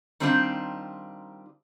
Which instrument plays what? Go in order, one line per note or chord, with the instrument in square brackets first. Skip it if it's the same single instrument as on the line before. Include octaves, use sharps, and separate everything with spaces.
[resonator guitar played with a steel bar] D#3 G3 C4 D4 D#4 F4